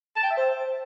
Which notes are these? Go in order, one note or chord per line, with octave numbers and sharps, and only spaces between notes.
A5
G5
E5
C5